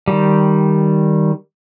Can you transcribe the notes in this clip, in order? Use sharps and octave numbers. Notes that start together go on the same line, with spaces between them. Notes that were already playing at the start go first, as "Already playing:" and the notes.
D#3 G3